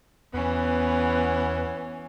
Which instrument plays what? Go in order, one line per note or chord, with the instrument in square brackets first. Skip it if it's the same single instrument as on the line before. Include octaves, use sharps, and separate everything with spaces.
[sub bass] E2 [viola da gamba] E3 C#4 [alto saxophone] B3